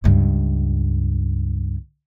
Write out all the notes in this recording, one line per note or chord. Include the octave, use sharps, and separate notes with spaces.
C#2 G2